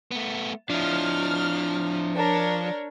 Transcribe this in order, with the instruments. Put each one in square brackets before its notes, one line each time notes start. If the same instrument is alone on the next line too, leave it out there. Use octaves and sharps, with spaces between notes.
[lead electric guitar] A3 B3
[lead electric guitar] F3 [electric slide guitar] D4 E4 [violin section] F6
[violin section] D4 A#4 C#5